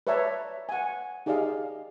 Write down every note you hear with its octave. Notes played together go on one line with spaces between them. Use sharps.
B4 C#5 D5 E5 A5 A#5
F#5 G#5
D#4 G4 G#4 D5 D#5 F5